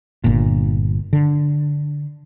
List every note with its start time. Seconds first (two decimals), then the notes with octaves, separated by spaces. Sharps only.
0.24 G1 A#2
1.13 D3